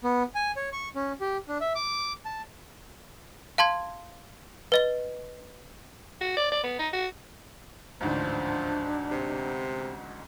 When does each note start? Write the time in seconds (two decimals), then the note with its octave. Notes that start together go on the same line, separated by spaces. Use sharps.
0.04 B3
0.35 G#5
0.56 C#5
0.72 C#6
0.95 C#4
1.21 G4
1.48 D4
1.61 E5
1.75 D6
2.25 A5
3.58 F5 A5 C6 G#6
4.72 B4 D#5 G7
6.21 F#4
6.37 D5
6.52 D5
6.64 B3
6.79 D#4
6.93 F#4
8.01 A1 D2 G#2 F3 D4
9.11 C3